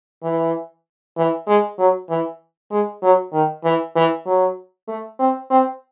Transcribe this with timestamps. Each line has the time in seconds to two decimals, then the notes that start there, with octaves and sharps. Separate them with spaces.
0.24 E3
1.18 E3
1.48 G#3
1.79 F#3
2.10 E3
2.72 G#3
3.03 F#3
3.33 D#3
3.64 E3
3.96 E3
4.27 F#3
4.88 A3
5.20 C4
5.51 C4